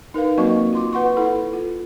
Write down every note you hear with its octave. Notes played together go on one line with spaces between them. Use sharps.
D#4 A#4 B4 F5
F#3 A#3 C4 F#4 D#5 C#6
F4 C6 D6
B4 F#5 C6 C#6
E4 A4 F#5
F4